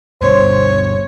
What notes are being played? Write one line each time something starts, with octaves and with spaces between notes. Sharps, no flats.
G2 B2 D3 C5 C#5